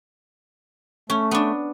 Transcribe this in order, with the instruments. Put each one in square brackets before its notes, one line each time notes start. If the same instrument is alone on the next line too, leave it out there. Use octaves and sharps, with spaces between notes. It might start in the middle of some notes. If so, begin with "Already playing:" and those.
[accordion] A3 [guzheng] C#4
[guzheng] B3 D4